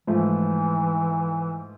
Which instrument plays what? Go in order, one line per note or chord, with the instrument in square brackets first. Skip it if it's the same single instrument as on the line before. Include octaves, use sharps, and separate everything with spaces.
[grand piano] G#2 F3 A3 [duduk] E3